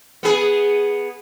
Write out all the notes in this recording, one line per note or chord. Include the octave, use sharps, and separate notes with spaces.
B3 G#4